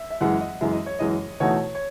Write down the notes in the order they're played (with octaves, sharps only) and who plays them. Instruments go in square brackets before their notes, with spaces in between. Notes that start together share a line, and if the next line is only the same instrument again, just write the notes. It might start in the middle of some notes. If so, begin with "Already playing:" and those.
Already playing: [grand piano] E5
E5
[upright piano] F#2 E3 G#3 [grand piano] F#5
[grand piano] D#5
[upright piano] F#2 E3 G#3 [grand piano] E5
[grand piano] D#5
C#5
[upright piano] F#2 E3 G#3 [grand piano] D#5
[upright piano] E2 B2 A3 D#4 F#4 [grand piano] C#5
[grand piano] C#5